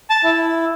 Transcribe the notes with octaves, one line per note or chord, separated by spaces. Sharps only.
A5
E4